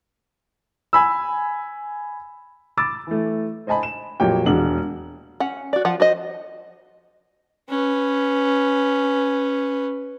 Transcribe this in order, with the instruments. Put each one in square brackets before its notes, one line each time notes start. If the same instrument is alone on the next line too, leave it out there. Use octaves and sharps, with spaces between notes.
[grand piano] G#5 B5 E6
[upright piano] B5 D6 E6 A6
E3 A3
C5 D#5 G#5 A5 B5
E7
F2 A#2 F#3 G4 C#5 G5
E1 G#3 D4 F#4 F#7
[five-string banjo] C#4 F#5
F#4 D5
F3 F4 F#5
F#4 C5 D#5
[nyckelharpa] C#4 B4